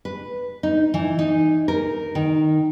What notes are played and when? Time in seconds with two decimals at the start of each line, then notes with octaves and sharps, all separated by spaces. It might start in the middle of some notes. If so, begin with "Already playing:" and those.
0.05 B4
0.63 D#4
0.94 E3
1.19 D#4
1.68 A#4
2.15 D#3